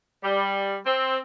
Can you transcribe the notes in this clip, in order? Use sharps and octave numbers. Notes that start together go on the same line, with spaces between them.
G3
C4